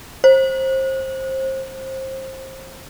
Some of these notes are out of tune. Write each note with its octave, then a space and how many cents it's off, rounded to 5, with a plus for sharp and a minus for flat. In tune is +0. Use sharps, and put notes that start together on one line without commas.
C5 +25